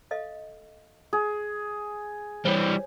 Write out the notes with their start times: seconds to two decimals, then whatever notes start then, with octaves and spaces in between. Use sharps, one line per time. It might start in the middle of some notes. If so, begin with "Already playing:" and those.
0.11 A4 D#5 F5
1.13 G#4
2.45 E3 G3 C5 C#5